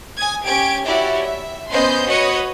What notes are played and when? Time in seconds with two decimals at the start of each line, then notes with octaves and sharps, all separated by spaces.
0.17 G#5 D#6 G#6
0.46 C#4 G4 G#6 D7
0.86 E4 F#4 G4 C#5 D5 E5
1.22 E5
1.72 B3 C#4 C5 D#5 C6 G6
2.07 F#4 B4 C#5 D#5 D#6 C#7